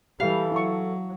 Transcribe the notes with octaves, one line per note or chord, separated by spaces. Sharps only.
E3 G3 G4 A4 F5
F#3 E4 A5 C#6